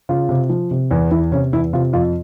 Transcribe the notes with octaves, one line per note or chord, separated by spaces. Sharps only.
C#3 F4
C3
F3
C3
E2
E2 E4
C3 C#4
E2 E4
C3 F4
F2 F4